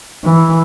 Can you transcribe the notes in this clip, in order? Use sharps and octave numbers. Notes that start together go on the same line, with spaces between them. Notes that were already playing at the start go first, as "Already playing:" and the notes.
E3